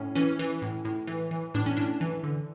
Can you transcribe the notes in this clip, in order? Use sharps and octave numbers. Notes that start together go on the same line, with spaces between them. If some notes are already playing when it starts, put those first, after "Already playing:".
Already playing: A2 C#4
E3 C#4
E3
A2
A2
E3
E3
A2 D4
C#4
A2 D4
E3
D3